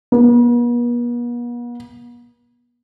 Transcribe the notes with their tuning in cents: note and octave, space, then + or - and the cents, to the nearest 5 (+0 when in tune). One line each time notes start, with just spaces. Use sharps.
B3 -45